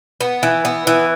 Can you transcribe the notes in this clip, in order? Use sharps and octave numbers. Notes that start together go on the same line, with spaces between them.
B3
E3
B3
E3